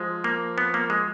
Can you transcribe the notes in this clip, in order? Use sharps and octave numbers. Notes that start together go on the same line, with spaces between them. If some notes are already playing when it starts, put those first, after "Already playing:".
Already playing: F3 G#3
A#3
B3
A#3
G#3